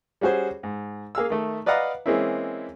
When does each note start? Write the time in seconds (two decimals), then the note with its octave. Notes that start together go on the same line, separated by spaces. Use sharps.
0.21 G3 C#4 F#4 G#4 C5
0.63 G#2
1.15 A#3 G#4 F5 E6
1.30 D#3 A3
1.66 B4 D5 D#5 F5 F#5 A#5
2.06 E3 G#3 A#3 C4 C#4 E4